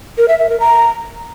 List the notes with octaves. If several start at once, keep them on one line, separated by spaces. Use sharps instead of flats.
A#4
E5
E5
A#4
A#5